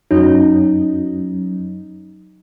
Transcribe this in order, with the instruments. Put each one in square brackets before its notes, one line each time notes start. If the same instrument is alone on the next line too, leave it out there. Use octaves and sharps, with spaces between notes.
[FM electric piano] F#2 F#3 C#4 [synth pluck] D#4